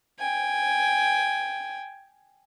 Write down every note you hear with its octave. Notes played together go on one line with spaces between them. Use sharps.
G5 G#5